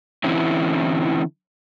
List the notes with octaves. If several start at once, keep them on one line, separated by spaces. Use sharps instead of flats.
D3 E3 C4 C#4 E4